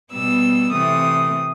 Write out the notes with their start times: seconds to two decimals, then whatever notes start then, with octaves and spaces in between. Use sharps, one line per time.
0.12 B2 G3 B3 E6
0.73 C3 E3 A3 D#6